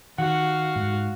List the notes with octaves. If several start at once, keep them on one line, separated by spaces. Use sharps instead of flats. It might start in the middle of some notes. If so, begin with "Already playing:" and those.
D#3 F#4 F5 F#5
G#2